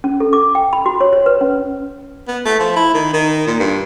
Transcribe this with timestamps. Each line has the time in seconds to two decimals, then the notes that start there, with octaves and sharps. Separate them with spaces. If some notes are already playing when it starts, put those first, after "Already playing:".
0.04 C#4
0.20 A4
0.33 D6
0.55 G5
0.73 B5
0.86 F#4
1.01 C#5
1.13 C#5
1.26 B4
1.41 C#4
2.27 B3
2.45 A3
2.59 F3
2.76 E4
2.94 D#3
3.13 D#3
3.47 A#2
3.60 G2